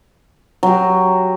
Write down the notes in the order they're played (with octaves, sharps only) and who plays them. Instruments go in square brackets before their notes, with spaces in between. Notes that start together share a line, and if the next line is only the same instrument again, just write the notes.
[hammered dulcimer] F#3 G4